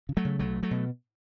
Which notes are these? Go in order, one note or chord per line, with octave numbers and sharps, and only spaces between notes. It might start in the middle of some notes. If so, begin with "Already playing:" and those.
C#3
F#3 A3
C#3
B1 F#3 A3
B2
F#3 A3
B2